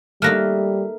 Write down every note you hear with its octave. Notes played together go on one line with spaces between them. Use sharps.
G3 A3 A#3 D#4 F6 F#6 A#6